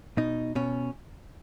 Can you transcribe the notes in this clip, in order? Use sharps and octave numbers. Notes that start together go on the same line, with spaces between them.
B2 D#4
B2 C#4